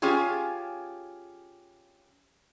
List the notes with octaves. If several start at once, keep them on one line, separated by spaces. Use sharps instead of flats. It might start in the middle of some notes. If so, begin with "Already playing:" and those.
C#4 F4 G4 G#4 G#5